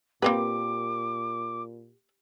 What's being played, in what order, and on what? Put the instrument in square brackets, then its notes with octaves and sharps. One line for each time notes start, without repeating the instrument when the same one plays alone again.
[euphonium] A#2 [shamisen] A#3 C4 B4 [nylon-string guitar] G4 [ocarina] D6